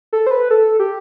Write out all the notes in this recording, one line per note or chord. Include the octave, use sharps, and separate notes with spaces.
A4
C5
B4
A4
G4